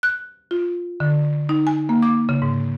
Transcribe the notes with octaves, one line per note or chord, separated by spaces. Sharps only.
F#6
F4
D3
D#4
G#5
A#3
D6
C#3
G#2